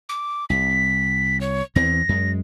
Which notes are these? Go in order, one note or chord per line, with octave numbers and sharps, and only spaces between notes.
D6
C2 B6
C#5
E2 E3 C4 A#6
F#2 G#3